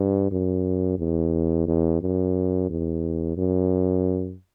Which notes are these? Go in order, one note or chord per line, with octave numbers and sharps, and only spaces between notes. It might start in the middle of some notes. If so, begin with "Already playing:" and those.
Already playing: G2
F#2
E2
E2
F#2
E2
F#2